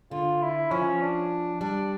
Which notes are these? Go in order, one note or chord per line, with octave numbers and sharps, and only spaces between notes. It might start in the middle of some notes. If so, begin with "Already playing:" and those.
D3 F4
E4
F3 C#4
D4
G3 D4